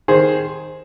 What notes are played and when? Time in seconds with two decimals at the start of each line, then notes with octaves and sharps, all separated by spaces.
0.08 D#3 G#4 C5